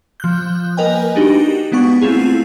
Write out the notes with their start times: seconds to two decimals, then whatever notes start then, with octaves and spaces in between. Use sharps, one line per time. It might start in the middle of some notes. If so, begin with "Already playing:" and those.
0.20 F3 F#6 G6
0.77 A#3 A#4 B4 D#5 G5 G#5
1.16 D4 D#4 F#4 G4
1.72 G#3 B3 D4 F#5 C#6
2.02 A3 C4 E4 F4 G#4